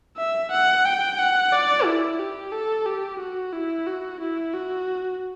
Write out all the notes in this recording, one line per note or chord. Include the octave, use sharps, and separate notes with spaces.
E5
F#5
G5
F#5
D5
E4
G4
A4
G4
F#4
E4
F#4
E4
F#4